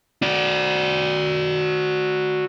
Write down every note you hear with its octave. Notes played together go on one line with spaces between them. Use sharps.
F#4 D5